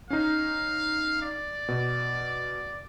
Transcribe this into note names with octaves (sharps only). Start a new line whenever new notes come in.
C#4 D#4 F5
D5
B2